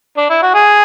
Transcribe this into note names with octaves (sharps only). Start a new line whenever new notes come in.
D4
E4
F#4
G#4